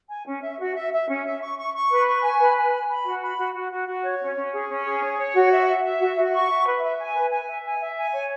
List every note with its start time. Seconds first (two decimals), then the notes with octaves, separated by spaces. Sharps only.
0.09 G#5
0.26 C#4
0.42 E5
0.59 F#4
0.75 E5
0.92 E5
1.08 C#4
1.25 E5
1.41 C#6
1.58 C#6
1.73 C#6
1.90 B4
2.07 C#6
2.22 G#5
2.39 B4
2.55 G#5
2.71 B5
2.88 B5
3.04 F#4
3.21 B5
3.37 F#4
3.54 F#4
3.71 F#4
3.86 F#4
4.04 C#5
4.20 C#4
4.35 C#4
4.53 G#4
4.69 C#4
4.85 G#4
5.02 C#5
5.18 C#5
5.35 F#4
5.51 E5
5.67 E5
5.83 E5
6.00 F#4
6.16 F#4
6.33 C#6
6.49 E5
6.65 B4
6.82 E5
6.98 G#5
7.14 B4
7.30 G#5
7.47 E5
7.64 G#5
7.80 E5
7.96 G#5
8.13 C#5